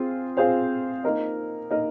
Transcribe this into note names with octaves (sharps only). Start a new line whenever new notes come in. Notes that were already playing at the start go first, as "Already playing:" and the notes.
Already playing: C4 F4 G#4
C4 F4 G#4 C5 F5
A#3 D#4 A#4 D#5
A#3 D#4 A#4 D#5